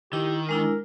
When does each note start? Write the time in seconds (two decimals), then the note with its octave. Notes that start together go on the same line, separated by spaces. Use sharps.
0.13 D#3 E4 G4
0.49 G#3 D4 E4 A#4